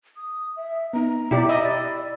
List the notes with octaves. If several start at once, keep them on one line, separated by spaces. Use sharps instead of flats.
D#6
E5
B3 D#4 A#5
B2 E4 G4 D5
D#5 E5 B5 E6
D5